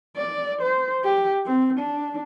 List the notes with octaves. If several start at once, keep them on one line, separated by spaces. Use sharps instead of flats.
D5
C5
G4
C4
D4